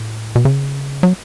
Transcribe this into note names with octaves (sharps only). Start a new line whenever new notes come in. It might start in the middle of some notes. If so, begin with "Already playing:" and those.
Already playing: A2
B2
C#3
F#3